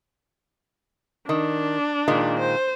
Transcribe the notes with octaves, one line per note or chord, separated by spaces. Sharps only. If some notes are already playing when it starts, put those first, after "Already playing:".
D#3 D4
A#2 D#3 G#3
C5